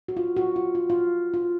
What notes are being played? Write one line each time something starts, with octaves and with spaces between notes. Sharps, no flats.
F#4
F4
F#4
F4
F4
F4
F4